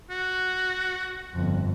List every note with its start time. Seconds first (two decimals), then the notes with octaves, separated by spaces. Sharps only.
0.10 F#4
1.34 G1 F2